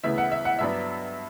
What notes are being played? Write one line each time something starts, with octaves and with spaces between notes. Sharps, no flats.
D2 C#3 E3 B3 E5
F#5
E5
F#5
G2 F#3 B3 D4 E5